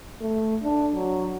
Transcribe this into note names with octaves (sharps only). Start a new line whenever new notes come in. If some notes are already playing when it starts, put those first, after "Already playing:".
A3
D4
F#3